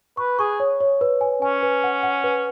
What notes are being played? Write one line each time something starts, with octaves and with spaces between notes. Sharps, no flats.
B4 C#6
G#4 C#6
C#5
C#5
B4
G#5
C#4 G#5
B4
F#5
F#5
B4